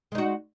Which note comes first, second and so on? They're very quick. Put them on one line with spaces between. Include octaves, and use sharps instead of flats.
G#3 D#4 F#4